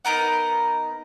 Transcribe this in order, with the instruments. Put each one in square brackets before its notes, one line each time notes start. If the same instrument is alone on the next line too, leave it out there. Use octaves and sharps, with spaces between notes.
[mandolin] B3 D#4 A#4 F#5